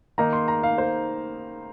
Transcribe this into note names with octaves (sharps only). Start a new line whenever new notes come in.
D#3 A#3 D#4 A#5
C6
A#5
F5
C5